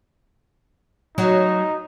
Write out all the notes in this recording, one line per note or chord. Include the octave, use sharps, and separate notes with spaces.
F#3 D#4